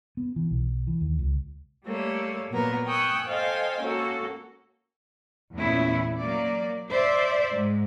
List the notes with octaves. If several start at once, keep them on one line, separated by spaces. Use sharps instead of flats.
B3
E3
B1
E3
D#2
C#2
G3 A3 A#3 C#5
A#2 F#3 A#3 B3 A#4
G5 G#5 C#6 D#6 E6 F#6
A4 C5 D#5 F5 G5 G#5
A#3 C#4 F#4 A4
E2 A#2 A3 B3 C#4 E4
F#3 A#3 D5
C5 D5 E5
G#2 G#3